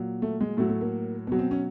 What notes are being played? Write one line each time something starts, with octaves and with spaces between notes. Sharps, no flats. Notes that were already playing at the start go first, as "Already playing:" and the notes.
Already playing: A#2 F#3
A3
G#3
A2 F#3 A3
A3
A#3
B2 F#3 B3
C4
C#4